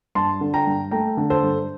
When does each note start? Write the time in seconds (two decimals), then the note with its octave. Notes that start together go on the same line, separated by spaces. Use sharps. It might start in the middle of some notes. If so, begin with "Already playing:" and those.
0.15 G2 A5 C6
0.41 D3
0.54 G5 A#5
0.67 G2
0.91 A3 G5 A#5
1.17 D3
1.30 A4 C5
1.43 G2